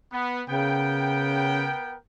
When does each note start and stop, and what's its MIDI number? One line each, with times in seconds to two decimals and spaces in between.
0.12 0.42 59
0.50 1.75 49
0.50 1.96 59
0.50 1.96 70
0.50 1.96 79